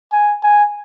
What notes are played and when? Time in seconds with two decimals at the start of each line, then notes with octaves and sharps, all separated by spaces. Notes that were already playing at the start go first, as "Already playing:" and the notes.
0.12 G#5
0.43 G#5